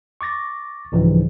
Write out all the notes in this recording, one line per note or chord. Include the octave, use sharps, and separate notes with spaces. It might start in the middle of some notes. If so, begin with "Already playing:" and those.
C#6 D6 A6 A#6
C2 G#2 C#3 E3 F3 G3